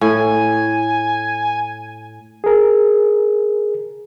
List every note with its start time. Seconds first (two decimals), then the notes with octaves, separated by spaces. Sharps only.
0.01 A2 G#5
2.44 G#4 A#4